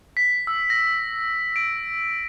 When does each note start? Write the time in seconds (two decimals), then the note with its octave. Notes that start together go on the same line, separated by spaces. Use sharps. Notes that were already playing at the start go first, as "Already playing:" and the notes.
0.17 B6
0.47 E6
0.70 A#6
1.56 D7